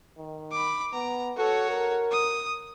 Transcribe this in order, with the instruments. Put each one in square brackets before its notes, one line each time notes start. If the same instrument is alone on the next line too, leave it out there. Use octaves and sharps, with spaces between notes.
[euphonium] D#3
[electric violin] B5 D6
[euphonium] B3 [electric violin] A#5
[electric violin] F#4 C#5 [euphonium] A4
[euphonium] A#4
[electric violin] D#6